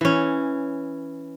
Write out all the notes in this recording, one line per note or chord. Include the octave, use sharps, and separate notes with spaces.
E3 C#4